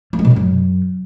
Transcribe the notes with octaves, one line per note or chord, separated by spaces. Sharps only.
A3
G#3
B2
C#3
F#2